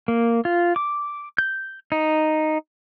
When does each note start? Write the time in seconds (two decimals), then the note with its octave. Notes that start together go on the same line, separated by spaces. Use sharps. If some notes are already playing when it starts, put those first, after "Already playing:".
0.08 A#3
0.45 F4
0.76 D6
1.38 G6
1.92 D#4